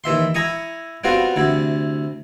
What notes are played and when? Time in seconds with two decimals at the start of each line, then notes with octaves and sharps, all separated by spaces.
0.04 D#2 E3 E5 C6
0.34 E4 G#5 A#5 C#6 D#6
1.04 G3 B3 C4 F4 F#4 F5
1.36 D2 C3 E4